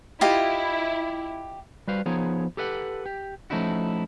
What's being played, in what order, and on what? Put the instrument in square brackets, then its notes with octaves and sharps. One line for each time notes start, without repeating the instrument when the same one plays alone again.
[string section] E4 [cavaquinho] F4 G4 D#5
[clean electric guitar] G3 F#4 B4 C5 F5
F3 B3 D#4 G#4 C#5
G4 A4 B4 E5 F#5
G4
F3 A3 C#4 D#4 E4 F#4